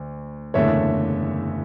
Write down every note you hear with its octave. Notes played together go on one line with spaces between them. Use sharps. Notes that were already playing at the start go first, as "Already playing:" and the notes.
Already playing: D2
F#1 E2 D3 A3 C#5 E5